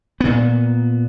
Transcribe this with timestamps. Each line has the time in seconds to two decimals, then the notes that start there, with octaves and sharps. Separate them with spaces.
0.21 A#2 B3